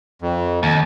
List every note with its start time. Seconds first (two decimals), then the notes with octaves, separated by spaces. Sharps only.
0.22 F2
0.63 D#2